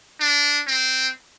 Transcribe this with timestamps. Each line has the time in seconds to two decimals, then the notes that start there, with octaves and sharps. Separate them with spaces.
0.20 D4
0.67 C4